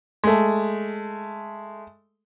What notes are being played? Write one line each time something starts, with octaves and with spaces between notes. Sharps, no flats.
G#3 A3